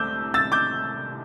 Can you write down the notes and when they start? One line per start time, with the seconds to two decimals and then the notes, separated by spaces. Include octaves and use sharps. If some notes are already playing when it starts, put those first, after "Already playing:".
Already playing: C2 C3 A3 C4 D6 E6 G6
0.34 E6 A6
0.52 D6 G6